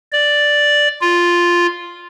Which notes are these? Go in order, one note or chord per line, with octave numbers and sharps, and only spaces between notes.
D5
F4